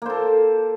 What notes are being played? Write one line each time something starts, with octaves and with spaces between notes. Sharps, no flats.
A#3 A4 C5